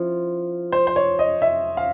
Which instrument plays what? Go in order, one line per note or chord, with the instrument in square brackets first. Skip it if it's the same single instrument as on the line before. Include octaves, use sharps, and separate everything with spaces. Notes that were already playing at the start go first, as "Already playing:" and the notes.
Already playing: [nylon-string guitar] F3 C#4 E4
[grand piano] C5
C5
C#5
D#5
E5
F5